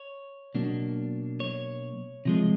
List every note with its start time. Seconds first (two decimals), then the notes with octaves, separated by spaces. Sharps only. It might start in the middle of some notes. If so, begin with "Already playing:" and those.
Already playing: C#5
0.55 B2 F#3 A#3 D4
1.40 C#5
2.25 C3 F3 G#3